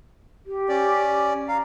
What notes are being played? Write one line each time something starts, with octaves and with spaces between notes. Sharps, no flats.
G4
C#4 D5
F5 A#5